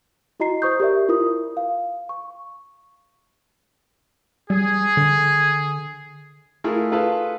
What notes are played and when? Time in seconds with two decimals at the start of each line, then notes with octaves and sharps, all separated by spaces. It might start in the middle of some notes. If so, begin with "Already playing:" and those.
0.40 E4 F#4 D#5 A#5 C7
0.62 C5 C#6 D#6 G6
0.80 G4 A#4 D5 E5
1.09 E4 F4 A#4 D#6
1.57 F5
2.09 C#6
4.50 G3 G#4
4.97 D3
6.64 A3 E4 F4 G#4 A#4
6.92 F4 G#4 A4 B4 F5 A5